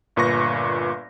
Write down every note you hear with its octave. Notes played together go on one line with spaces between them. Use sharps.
G1 A#2 B4 C#6 A#6